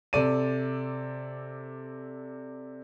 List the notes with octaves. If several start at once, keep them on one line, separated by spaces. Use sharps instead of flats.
C3 A4 D5 D#7